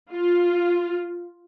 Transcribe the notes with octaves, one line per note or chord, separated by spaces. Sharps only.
F4